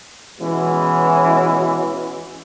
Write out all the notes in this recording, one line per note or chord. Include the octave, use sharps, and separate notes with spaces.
B2 E3 G#3 C#4 F#4